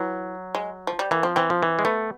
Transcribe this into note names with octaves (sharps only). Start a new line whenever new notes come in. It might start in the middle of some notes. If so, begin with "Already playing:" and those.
Already playing: E3 F#3
G#3
F3
G3
E3 A#3
F3 C4
E3 C4
F3
E3
G#3
A3 B3